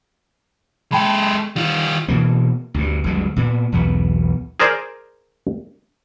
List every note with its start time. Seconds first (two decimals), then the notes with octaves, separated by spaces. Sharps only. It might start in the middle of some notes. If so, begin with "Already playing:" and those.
0.92 G#3 A4 G5 A5 B5
1.56 D#3 G3 F4
2.08 B2 E3 A#3
2.74 D2 G2
3.04 G1 D2 F#3 G#3
3.36 A#2 B3
3.72 B1 E2 B3
4.60 G#4 A#4 C5 D5 G#5